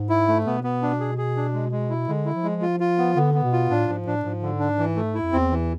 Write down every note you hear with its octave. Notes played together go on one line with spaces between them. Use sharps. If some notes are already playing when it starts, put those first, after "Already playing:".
Already playing: G#2
E4
A3
B2 B3
B3
D4
G#4
G#4
D4
G#3
G#3
E4
D3 G#3
E4
F3
G#3
F4
F4
B3
D3 B3
B3
B2
F4
A2 D4
G#2 F3
A2 D4
G#2 F3
D3
D4
E3
A3
E4
F2
E2 C4
E3